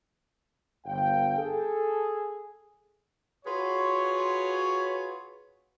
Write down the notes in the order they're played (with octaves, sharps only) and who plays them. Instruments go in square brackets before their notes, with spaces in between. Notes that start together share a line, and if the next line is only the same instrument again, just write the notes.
[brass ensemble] G1 F5 G5
[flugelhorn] G#4 [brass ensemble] A4
[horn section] F4 F#4 G#4 B4 C#5